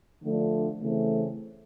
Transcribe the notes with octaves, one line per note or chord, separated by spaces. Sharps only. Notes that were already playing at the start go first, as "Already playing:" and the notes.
D3 F3 A3 D4
C#3 E3 A3 C4